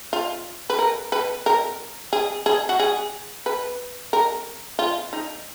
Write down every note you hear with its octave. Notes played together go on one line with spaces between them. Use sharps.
F4
B4
A#4
B4
A#4
G#4
G#4
F#4
G#4
B4
A#4
F4
D#4